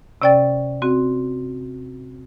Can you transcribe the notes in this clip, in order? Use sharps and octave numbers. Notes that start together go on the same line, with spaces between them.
C3 C#4 D5 G5 A6
C4 F#4